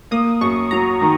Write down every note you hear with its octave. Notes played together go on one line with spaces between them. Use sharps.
A#3 D#6
F#2 C#6
F#3 A#5
D#3